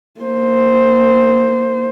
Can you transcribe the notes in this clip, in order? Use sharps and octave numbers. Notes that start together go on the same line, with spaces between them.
A#3 C5